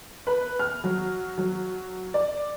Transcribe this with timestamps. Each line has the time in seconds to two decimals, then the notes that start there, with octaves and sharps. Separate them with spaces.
0.27 B4
0.59 F6
0.84 F#3
1.38 F#3
2.14 D5